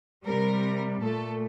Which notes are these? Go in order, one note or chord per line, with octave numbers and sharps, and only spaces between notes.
C3 G3 A#4
A#2 A3 A4